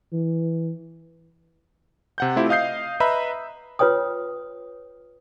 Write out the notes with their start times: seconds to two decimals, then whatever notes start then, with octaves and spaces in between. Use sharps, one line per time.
0.13 E3
2.18 C3 F#5 G6
2.36 A3 C4 E4 F4 G4
2.49 D#5 F5 D#6 G6 C7
3.00 B4 D#5 E5 A#5 B5 E6
3.79 F4 B4 C#5 G5 D#6